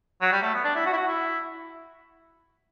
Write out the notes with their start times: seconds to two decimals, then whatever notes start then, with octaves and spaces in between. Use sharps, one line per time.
0.21 F#3
0.32 G3
0.42 A3
0.54 B3
0.65 D4
0.75 E4
0.86 F#4
0.93 E4
0.97 F#4
1.07 E4